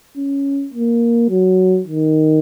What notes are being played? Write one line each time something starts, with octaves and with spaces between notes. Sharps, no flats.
C#4
A#3
F#3
D#3